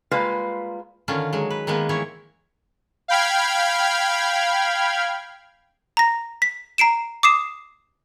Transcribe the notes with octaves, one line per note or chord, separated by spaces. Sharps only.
G3 G#3 A#3 F4 B4
D3 D#3 C#4 F4
F#3 G#3
B4
D#3 G#3 A#3 B3 B4
D#3 E3 E4 C#5
F5 G5 B5 F6 G#6
A#5 A#6
B6
A#5 C7 D7 E7
D6 D#6 C7 E7